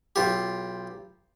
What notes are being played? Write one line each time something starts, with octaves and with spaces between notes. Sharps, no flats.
B1 F4 G4